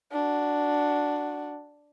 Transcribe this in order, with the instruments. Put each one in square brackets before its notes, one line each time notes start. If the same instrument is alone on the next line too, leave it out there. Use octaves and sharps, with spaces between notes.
[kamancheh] D4 F#4